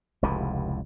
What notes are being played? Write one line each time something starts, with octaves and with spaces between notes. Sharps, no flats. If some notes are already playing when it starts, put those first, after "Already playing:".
F1 C#2 A2 C3